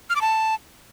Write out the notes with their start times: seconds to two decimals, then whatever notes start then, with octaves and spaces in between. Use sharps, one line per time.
0.10 F6
0.15 D6
0.21 A5